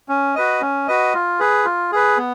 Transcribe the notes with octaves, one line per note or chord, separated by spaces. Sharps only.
C#4
F#4 B4 D#5
C#4
F#4 B4 D#5
F4
G#4 B4
F4
G#4 B4
B3